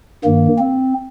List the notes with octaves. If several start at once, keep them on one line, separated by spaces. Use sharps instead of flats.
G2 D#3 A#3
C4